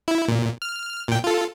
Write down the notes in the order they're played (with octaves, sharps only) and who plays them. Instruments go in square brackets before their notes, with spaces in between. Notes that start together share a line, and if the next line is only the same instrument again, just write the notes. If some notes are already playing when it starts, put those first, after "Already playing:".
[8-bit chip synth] E4
A#2
F6
A#2 G5
F4 A4